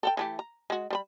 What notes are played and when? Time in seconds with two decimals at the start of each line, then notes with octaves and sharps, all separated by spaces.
0.03 A4 F#5 G5
0.17 E3 A3 G4
0.39 A#5
0.70 G#3 F#4
0.90 G3 C5 B5